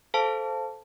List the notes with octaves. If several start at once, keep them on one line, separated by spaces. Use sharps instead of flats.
A4 C5 F5 A5